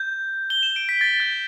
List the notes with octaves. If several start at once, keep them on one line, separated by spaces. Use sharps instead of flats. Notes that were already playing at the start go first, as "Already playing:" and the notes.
Already playing: G6
G7
E7
D7
B6
A6
G6